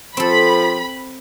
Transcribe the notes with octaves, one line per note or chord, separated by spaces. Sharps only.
F3 C4 A4 B5